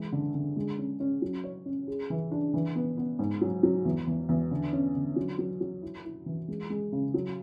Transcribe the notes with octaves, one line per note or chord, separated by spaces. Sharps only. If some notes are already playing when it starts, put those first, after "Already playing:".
Already playing: E3 G#3
D3
D3
G#3
C#4
C#4
F#3
C#5
C#4
G#4
E3
D4
E3
B3
B3
G#2
F#3
F#3
E2
E2
E2
D3
C#4
D3
F#3
F#3
F#3
E4
E4
E3
G#3
G#3
C#3
F#3